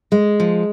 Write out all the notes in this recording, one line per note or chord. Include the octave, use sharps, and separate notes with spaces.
G#3
F3